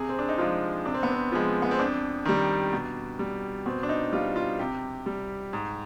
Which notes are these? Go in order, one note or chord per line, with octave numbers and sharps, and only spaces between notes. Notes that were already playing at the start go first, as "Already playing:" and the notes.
Already playing: C3 G#4
C4
D4
D#4
F3 G#3 F4
C3 D4
C4
B3
C4
F3 G#3
B3
C4
F2 D4
D#3 G3
B2
G3
B2 C4
D4
D#4
G3 F4
F4
C3 G4
G3
G#2